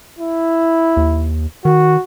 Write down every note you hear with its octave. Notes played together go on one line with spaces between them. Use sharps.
E4
D#2
D#3 F#4